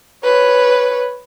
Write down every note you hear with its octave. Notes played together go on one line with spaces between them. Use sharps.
B4 C#5